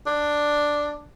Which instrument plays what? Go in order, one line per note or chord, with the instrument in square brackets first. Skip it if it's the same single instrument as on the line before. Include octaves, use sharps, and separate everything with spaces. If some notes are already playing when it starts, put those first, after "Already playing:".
[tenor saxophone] D4